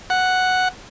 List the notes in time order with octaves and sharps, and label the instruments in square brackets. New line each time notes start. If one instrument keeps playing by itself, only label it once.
[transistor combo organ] F#5